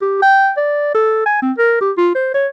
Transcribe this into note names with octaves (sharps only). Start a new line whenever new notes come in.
G4
G5
D5
A4
G#5
C4
A#4
G4
F4
C5
C#5